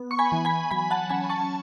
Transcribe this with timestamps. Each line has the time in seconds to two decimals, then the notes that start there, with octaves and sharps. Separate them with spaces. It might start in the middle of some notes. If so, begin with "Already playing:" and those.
Already playing: B3
0.11 C#6
0.19 G#5 B5
0.32 E3
0.45 G#5 B5
0.71 F#3 G#5 B5
0.91 F#5 A5
1.09 C#4 G#5 B5
1.29 A5 C#6